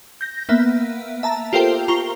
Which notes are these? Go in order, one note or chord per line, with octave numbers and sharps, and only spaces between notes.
G6 A#6
A#3 B3 E5
E5 A5 A#5
F4 G4 A4 A#4 C5 G5
F4 A#5 C#6 G7